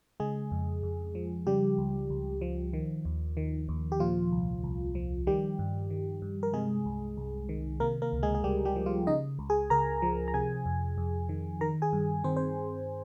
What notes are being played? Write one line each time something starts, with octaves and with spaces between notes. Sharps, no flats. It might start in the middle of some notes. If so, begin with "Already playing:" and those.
C#3 G#3 G#4
F2
F2
F3
C#3 G3 G4
C#2
C#2
F3
D#3
D#2
D#3
D#2
G4
A#2 F3 F4
C2
C2
F3
D#3 G3 G4
G2
D#3
G2
A#4
C3 G#3 G#4
C2
C2
D#3
C3 A#3 A#4
A#3 A#4
C#2
G#3 G#4
G#4
C#2 G3 G4
G3 G4
F3
F3 F4
C#3 D#4 D#5
C#2
G#4 G#5
C#2 A#4 A#5
F3
A#5
C3 G#4 G#5
F2
F2
D#3
D#3 A#4 A#5
G#4 G#5
G2
D#3 C4 C5
C5